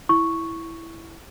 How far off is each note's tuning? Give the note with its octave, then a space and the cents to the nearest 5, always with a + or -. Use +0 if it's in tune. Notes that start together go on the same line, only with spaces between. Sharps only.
E4 +0 C#6 +0